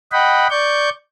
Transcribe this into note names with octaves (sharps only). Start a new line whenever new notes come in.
D#5 F#5 G5 B5
D5 C#6 G6